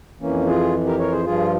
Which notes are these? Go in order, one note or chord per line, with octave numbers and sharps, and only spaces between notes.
F2 E3 A#3 C#4
F4 G#4
G4 A#4
A#4 C#5
G#4 C5
G2 F3 F4 G#4